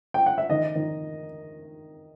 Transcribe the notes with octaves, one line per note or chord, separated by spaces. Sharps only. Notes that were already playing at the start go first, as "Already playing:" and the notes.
G5
F#5
E5
D#3 D#5
D#3